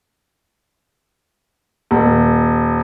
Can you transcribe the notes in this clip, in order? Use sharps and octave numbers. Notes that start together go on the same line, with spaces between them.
D#1